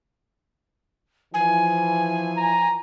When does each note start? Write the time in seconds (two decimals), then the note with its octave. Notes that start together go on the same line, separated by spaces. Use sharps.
1.34 E3 F3 G#5
2.37 A#5